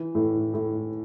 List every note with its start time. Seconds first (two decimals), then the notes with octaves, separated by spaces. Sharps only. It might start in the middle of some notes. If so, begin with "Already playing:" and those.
Already playing: E3
0.15 A2
0.54 A2